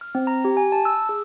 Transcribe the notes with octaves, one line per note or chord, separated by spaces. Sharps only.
F6
C4
A#5
G4
G#5
A5
E6
G#4